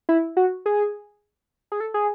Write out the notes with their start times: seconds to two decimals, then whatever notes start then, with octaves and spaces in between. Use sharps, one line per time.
0.09 E4
0.37 F#4
0.66 G#4
1.72 G#4
1.80 A4
1.94 G#4